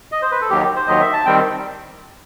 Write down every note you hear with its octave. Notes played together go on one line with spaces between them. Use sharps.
D#5
C5
B4
A4
D#2 D#3 F#3 G4
C5
D#2 D#3 F#3 D#5
E5
A5
D#3 G3 C4 G5